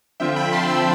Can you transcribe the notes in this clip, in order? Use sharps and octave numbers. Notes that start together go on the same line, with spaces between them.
D3 F3 C4 F4 E5 G5
G5 B5
A5 C6
C6 E6